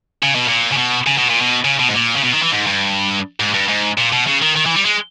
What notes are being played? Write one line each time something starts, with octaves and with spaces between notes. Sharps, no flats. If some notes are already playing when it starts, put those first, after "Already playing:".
C#3
B2
A#2
C#3
B2
C#3
B2
A#2
B2
C#3
B2
G#2
A#2
C#3
B2
D#3
E3
G#2
G2
G#2
G2
G#2
A#2
B2
C#3
D#3
D#3
E3
G3
G#3